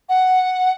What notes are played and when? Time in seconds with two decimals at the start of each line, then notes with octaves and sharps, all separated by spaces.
0.09 F#5